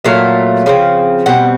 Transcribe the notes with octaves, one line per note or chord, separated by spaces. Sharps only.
A#2 F#3 A3 F5
C#3 F3 A3 C4
B2 G3 C4 F#5